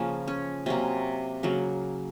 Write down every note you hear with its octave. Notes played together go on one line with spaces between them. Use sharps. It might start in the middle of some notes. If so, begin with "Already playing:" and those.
Already playing: C#3 F3 A#3 C#4
C#4
C3 F#3 A#3 C#4
C#3 F#3 A#3